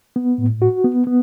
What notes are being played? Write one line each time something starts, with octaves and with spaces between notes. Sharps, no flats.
B3
A2
F#4
B3
B3